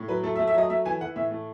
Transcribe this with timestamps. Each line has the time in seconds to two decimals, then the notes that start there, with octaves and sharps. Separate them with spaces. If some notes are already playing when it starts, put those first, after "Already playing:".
Already playing: A2
0.08 F#3 B4
0.23 A3 A4
0.36 E5
0.39 A3
0.47 E5
0.55 F#3 D#5
0.70 A3 E5
0.85 E3 G#5
1.01 E3 F#5
1.16 A2 E5
1.31 A3